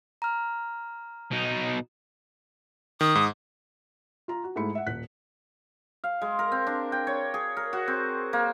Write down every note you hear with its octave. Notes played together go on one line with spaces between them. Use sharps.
A#5 F6
B2 D#4
D#3 D#6
G#2
F4 A#5
F#4
G#2 G#3 A3 E4 B5 C#7
E5 F#5
D#1 F#6 B6
F5
G#3
A#4
C4
D4
G5
C#5
G#4
A#4
F#4
C4
A#3